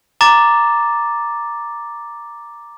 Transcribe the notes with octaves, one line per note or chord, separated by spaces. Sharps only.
A#5 D6 A6 E7